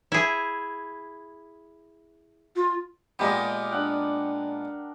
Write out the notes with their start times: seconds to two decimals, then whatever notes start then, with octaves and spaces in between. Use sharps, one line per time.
0.12 E4 G#4
2.56 F4
3.19 A#2 G#3 B3 G4 A#4 D#5
3.71 D4 F#5 G5